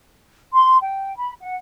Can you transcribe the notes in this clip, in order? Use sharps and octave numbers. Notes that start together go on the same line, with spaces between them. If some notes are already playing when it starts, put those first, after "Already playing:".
C6
G5
B5
F#5